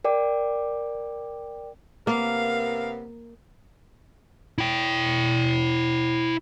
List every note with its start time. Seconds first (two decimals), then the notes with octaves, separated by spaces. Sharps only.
0.04 A#4 D5 G5 D6
2.07 C3 A#3 B3 A#4 F5
4.58 E4 G5